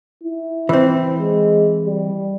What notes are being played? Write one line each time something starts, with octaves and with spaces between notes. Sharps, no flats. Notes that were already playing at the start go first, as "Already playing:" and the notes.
E4
E3 C4
G#3
G3